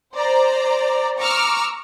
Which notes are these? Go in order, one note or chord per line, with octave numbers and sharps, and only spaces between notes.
C5 D5 A#5
A#5 C#6 D6 E6 F6